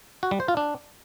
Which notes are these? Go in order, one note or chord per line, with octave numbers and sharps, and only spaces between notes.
F#4
G3
C5
F4
D4